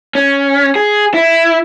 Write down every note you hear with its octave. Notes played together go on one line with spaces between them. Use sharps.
C#4
G#4
E4